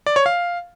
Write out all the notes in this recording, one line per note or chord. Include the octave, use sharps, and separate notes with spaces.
D5
C#5
F5